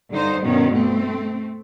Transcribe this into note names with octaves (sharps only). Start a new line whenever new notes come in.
G2 D3 D#4 C5
G2 B2 D#3 C#4
A3 C4